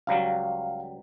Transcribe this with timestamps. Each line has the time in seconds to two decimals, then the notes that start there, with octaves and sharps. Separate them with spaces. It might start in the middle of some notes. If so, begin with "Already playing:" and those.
0.07 C#2 F#3 G3 F5